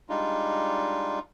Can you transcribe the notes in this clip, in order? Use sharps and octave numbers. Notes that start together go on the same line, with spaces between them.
G3 G#3 D4 D#4 F4